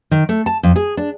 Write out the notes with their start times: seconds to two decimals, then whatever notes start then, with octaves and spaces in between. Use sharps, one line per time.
0.11 D#3
0.29 A3
0.46 A5
0.63 F2
0.76 G#4
0.97 D4